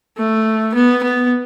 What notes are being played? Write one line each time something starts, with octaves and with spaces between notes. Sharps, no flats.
A3
B3
B3